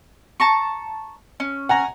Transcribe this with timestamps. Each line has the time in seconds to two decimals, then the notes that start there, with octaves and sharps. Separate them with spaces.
0.40 A5 A#5 C#6
1.40 C#4
1.69 F#5 G#5 A#5